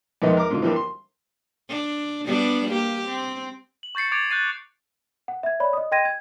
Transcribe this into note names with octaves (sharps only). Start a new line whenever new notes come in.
F2 C3 D#3 G#3 B3 D#4
A#4 D6
G#2 D3 F4
E3 F3 G3 A#3 D4
C6
D4
G3 B3 D4
A#3 G4
C4
F#7
C#6 G6 A6 C7 C#7
D6 G#6 A6 D7
F#6 G6 A6 C7 D#7
F#5
E5 G#6
C#5 D5 B5
D#5 D#6
D#5 G5 C6 G#6 A#6 D#7
G#6